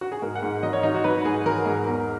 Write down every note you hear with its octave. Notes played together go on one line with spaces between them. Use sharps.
F#4
G#4
G#2 A#4
F#5
G#2
F#3 D#5
C#5
F#3 D#4
F#4
F#3 B4
G#2 G#4
F#3 A#4
G#2
E2